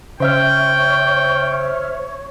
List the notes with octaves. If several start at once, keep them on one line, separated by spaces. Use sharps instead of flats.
C#3 C5 C#5 E5 G5 F6